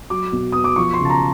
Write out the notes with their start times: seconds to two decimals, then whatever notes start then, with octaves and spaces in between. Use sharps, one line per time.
0.10 F#3 D6
0.32 B2
0.52 B3 D#6
0.64 D6
0.76 F3 C#6
0.94 C6
0.99 C#3
1.05 A5
1.10 A#5